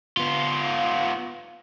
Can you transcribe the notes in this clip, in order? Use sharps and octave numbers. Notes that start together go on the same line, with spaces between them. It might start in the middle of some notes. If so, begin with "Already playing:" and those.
B3 F4